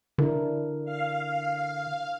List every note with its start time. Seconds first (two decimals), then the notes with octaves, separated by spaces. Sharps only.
0.18 D3 D4 E4 A#4
0.85 F5